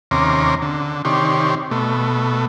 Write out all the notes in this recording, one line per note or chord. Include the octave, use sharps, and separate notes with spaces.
D#2 C3 C#4 A#5 C6 D6
D3
C3 D#3 G4 C#5 D5 C6
B2 A3